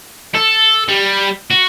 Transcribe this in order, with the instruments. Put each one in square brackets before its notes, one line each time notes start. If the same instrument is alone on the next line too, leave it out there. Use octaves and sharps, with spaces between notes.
[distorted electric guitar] A4
G3
F#4